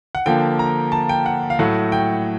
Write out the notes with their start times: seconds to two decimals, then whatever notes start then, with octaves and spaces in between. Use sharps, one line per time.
0.15 F#5
0.26 D3 F3 A#3 G5
0.59 A#5
0.92 A5
1.09 G5
1.26 F#5
1.50 F5
1.59 A2 F#3 A3 F#5
1.92 G5